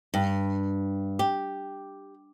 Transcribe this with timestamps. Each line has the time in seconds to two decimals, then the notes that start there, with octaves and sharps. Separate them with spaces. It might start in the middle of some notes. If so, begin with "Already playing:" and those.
0.14 G2
1.19 G4